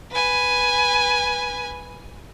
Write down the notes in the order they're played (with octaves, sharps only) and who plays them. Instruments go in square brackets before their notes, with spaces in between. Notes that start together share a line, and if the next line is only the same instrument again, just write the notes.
[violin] B4 G#5